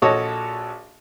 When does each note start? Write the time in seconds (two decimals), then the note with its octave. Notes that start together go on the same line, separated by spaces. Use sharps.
0.02 A#1 F#4 A4 C#5 D#5